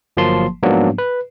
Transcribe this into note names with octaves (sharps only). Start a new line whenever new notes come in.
G1 F3 F#3 A#3 A5 C6
G#2 F3 F#3 A#3 B3 D4
B4